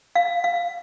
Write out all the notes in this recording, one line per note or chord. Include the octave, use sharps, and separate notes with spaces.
F5
F5